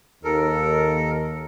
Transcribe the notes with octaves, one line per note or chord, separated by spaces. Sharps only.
D#2 A4 A#4